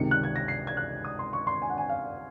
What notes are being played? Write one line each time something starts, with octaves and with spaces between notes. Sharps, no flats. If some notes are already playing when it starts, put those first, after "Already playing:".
Already playing: C#2 C3 D#3 C#7
F#6
G#6
A#6
C7
G#6
F#6
D#6
C6
C#6
C6
G#5
F#5
G#5
F5